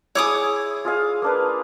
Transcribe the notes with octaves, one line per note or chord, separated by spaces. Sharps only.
E4 G#4 C#5 D6 D#6
F4 G#4 F5
A#3 D4 B4